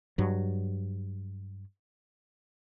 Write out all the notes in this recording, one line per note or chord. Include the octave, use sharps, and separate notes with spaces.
G2 F#3